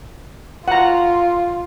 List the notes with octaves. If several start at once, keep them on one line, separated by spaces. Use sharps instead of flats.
F4 F#5 A#5